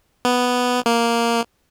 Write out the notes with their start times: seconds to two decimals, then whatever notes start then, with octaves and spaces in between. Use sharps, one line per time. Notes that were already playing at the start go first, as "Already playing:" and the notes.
0.25 B3
0.86 A#3